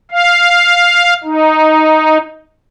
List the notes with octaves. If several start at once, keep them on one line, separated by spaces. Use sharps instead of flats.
F5
D#4